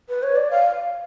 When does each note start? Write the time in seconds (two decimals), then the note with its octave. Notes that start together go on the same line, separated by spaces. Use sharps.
0.09 B4
0.23 C#5
0.36 D5
0.51 F5